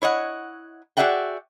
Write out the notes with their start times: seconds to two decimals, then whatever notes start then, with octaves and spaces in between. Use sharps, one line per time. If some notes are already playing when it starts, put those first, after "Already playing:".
0.02 E4 C#5 D#5 F#5
0.97 F#4 G#4 D5 E5 F#5 G5